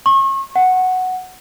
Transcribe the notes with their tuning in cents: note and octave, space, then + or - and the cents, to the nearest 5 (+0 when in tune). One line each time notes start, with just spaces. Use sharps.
C#6 -35
F#5 +0